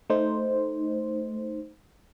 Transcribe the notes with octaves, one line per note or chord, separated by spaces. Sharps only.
A3 D#4 C5